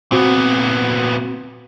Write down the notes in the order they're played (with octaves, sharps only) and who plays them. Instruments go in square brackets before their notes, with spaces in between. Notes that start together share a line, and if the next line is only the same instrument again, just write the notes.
[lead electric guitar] A#2 B3 [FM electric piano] C4 F#4